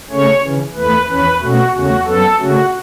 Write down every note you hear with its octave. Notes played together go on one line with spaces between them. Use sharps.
C#3 A3 C#4 C#5
C#3 E3 C#4
E2 E3 A3 B4
E2 E3 C#4 B4
B2 A3 C#4 F#4
E2 C#3 A3 C#4 F#4
F#2 F#3 B3 A4
C#3 A3 C#4 F#4